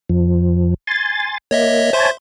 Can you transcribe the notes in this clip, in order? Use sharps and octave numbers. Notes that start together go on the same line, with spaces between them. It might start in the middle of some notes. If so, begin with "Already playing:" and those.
F2 F3
G#5 C6 A6
A#3 C#5 D#5 E5
C5 C#5 E5 G#5 A5 C6